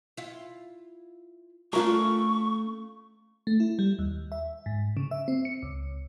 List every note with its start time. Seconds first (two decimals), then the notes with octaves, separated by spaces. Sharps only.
0.17 E4 F4
1.73 A3 C#4 D4 F4 A#4 C#6
3.47 A3
3.60 E4
3.79 G3
3.99 D#2
4.32 E5
4.66 G#2
4.97 C#3
5.11 E5
5.28 C4
5.45 C#7
5.63 C#2